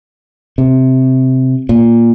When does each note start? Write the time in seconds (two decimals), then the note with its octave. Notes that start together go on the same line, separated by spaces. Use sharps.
0.58 C3
1.69 A#2